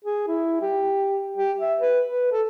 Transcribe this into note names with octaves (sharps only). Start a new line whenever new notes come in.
G#4
E4
G4
G4
E5
B4
B4
A4